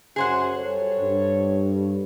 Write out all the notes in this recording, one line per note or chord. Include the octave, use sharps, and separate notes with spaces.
F#2 G#4 C5 F#5
G3 A4 C#5
G2